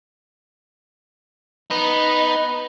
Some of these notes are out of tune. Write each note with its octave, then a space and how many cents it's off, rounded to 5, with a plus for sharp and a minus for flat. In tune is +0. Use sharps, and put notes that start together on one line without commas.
B3 +0 D#4 +0